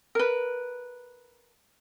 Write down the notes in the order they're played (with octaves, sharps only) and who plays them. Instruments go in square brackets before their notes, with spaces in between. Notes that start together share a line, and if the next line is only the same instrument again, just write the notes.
[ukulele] A#4 B4